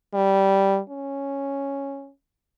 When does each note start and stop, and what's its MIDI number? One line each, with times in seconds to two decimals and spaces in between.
0.14 0.79 55
0.89 2.11 61